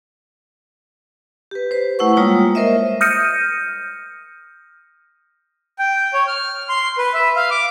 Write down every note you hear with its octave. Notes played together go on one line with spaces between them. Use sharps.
G4 B4
B4 C5
A3 E4 F#5 C#6
G3 G#3 A#3 F4 C#5 D#6
A#4 C5 D#5 E5
D#6 F6 G6 A#6 C#7 D#7
G5
C#5
F6
C6
B4
E5
F5
D6